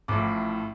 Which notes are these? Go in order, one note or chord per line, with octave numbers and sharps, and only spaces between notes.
A1 A2 F3 D6